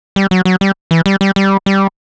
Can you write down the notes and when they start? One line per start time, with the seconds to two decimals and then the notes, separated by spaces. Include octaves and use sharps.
0.16 G3
0.31 F#3
0.45 F#3
0.61 G3
0.91 E3
1.06 G3
1.21 G3
1.36 G3
1.66 G3